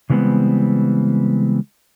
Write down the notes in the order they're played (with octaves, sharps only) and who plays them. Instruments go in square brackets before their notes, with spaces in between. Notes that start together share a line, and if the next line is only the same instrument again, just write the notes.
[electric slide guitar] C#3 E3 G3 G#3 B3 C4